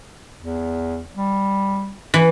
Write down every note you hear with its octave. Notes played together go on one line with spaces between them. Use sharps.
E2
G3
E3